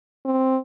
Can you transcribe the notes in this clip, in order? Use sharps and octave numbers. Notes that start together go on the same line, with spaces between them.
C4